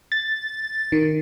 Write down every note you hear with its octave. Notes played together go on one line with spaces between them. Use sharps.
A6
D#3